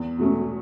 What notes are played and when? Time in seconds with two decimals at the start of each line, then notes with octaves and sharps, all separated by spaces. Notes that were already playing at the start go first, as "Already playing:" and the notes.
Already playing: E2
0.19 B2 A3 C#4